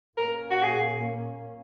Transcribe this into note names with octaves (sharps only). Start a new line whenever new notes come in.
A#2 A#3 C#4 A#4
F#4
G#4